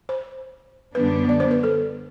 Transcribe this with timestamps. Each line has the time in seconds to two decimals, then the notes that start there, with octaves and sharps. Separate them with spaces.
0.09 C5
0.95 F#2 D3 G3 B3 D4 B4
1.29 D5
1.40 C5
1.51 B4
1.63 A4